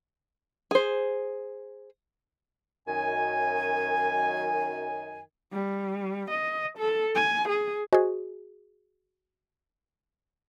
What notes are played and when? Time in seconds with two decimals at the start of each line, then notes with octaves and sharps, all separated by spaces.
0.71 G#4 C5
2.88 F#2 D#3 G#5
5.52 G3
6.30 D#5
6.78 A4
7.15 G#5
7.49 G#4
7.93 F#4 G#4 C5 D#5 G#5